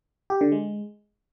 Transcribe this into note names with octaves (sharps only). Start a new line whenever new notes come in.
G4
D3
G#3